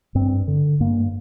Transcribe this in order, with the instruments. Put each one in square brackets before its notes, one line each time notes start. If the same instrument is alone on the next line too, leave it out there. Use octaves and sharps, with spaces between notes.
[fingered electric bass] G2 C4
D3
G2 A#3